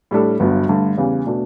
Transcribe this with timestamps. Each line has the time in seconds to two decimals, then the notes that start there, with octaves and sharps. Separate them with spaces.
0.11 A2 G3 D4 A4
0.40 G1 G2 F#3 B3
0.69 G2 D3 A3
0.98 E2 C#3 G3
1.27 B2 A3 D4